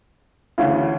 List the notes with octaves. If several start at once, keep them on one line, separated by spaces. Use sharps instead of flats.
D2 C#3 E3